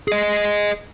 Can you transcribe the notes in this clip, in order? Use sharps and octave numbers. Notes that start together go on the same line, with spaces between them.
G#4 D#5